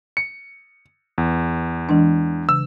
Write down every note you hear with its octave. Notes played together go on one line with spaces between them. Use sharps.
C#7
E2
E3 G#3 D4
C#3 E6